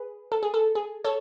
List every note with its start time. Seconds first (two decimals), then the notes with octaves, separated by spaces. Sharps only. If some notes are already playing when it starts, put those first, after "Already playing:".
Already playing: G#4 B4
0.32 A4
0.43 G#4
0.54 A4
0.75 G#4
1.04 A4 C#5